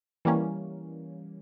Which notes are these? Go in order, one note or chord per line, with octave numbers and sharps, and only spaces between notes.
E3 G3 A#3 C#4